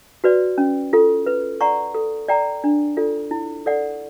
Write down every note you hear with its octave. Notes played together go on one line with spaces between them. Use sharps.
F#4 B4 D5
C#4
F4 A4
B4
D5 F#5 A#5 C#6
A4
D5 G5 A#5
D4
F4 A4 D5
E4
A4 D5 F#5